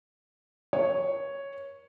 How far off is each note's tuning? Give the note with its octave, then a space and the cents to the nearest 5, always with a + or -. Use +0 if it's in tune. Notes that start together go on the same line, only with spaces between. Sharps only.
A#4 +35 C#5 +0